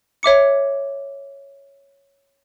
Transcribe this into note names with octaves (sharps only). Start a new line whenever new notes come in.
C#5 E5 D6 C#7